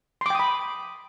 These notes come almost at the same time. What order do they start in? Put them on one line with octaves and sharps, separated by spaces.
C6 D6 G5 D#6 B5